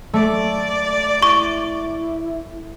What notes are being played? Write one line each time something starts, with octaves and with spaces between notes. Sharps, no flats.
A3 D5
E4 C#6